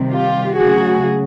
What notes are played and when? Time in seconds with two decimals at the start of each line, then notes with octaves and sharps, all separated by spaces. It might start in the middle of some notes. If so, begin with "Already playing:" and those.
Already playing: C3 D#3 G3
0.11 F4 G4
0.55 C#3 F#3 A3 F#4 G#4